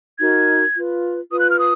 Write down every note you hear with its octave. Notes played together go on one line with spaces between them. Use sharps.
D#4 F#4 A#4 G#6
F4 B4
F4 B4 D#6
F#6
F6
D#6